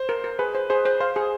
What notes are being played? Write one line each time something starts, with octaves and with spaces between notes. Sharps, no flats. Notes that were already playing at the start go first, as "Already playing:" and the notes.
Already playing: C5
A#4
A#4
G#4 B4
C5
G#4 C5
C5
C5 F5
G#4